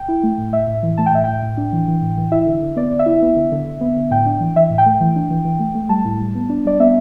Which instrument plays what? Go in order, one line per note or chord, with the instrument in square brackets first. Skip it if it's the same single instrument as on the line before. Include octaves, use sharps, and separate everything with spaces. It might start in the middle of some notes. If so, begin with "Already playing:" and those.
Already playing: [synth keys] G5
E4
A3
A2
A2 E5
A2
E3
A3 A5
G5
A2 E5
A2 G5
A2
D4
E3
E3
A2
E3
E4 E5
D3
D3
B3 D5
D3
E5
E4
B3
D3
D3
D3
B3
D3
A2 G5
D4
E3
E3 E5
A2
G5
A3
E3
D4
E3
E3
A3
A3
G3 A5
A2
G3
B3
D4
G3 D5
B3 E5